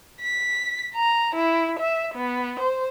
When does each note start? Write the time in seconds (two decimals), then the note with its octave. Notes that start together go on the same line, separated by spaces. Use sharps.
0.21 B6
0.95 A#5
1.35 E4
1.79 E5
2.15 B3
2.60 C5